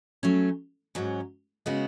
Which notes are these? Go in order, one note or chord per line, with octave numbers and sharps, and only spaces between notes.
F#3 A3 C#4
G#2 F#3 C#4
C#3 G#3 B3 F#4